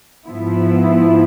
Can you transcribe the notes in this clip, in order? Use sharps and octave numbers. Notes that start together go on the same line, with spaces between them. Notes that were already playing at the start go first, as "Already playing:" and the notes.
G#2 F3 B3 E4